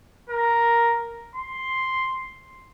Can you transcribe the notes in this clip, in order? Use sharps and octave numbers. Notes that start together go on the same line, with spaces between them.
A#4
C6